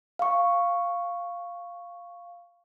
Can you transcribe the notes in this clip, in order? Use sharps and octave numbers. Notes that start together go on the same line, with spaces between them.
F5 C#6